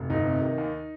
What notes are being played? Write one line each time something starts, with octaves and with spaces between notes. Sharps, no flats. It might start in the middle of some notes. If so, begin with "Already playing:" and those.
Already playing: F1
G1 D#4
C3
D#3
D#2